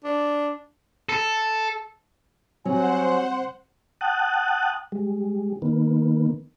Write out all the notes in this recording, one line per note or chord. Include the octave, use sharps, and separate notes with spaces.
D4
A4
F#3 G3 C4 C5 F#5 G#5
F#5 G5 A5 D#6 F#6
G3 G#3
D#3 A#3 B3